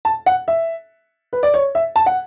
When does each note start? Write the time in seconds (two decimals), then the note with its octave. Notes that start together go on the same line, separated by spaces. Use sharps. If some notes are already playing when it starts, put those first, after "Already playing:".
0.05 A5
0.26 F#5
0.48 E5
1.33 B4
1.43 D5
1.54 C#5
1.75 E5
1.96 A5
2.06 F#5